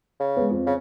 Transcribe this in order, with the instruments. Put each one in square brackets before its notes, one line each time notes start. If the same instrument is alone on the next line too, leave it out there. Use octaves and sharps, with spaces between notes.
[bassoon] C#3
[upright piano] G#3 B3
F2
[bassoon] C#3